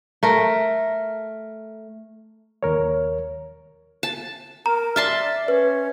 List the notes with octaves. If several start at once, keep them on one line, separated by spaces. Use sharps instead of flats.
A3 A#4
D#2 A#4 C#5
A5 E7
A#4 A#5
D5 E5 A5 C6 F6
C#4 B4